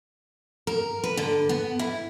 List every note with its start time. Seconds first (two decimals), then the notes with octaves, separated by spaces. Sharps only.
0.67 A#4
1.04 B4
1.17 D3
1.49 B3
1.79 E4